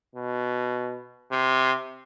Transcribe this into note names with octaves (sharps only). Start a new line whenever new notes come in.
B2
C3